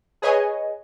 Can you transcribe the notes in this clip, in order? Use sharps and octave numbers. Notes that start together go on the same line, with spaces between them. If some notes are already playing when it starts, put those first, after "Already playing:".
G#4 B4 C#5 D#5 G#5